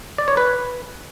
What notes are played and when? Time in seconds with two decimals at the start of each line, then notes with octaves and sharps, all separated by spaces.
0.18 D5
0.28 C#5
0.37 B4